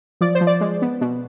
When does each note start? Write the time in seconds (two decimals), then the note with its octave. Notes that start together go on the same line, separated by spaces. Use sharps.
0.21 F3 D5
0.35 C5
0.41 F3
0.47 D5
0.61 G#3
0.82 B3
1.01 B2